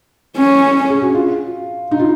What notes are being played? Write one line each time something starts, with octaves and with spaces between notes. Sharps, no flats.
C#4
G#4
F#4
F4
D#4
F4